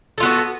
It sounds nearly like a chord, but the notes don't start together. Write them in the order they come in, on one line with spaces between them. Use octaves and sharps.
A4 F4 B3 F#4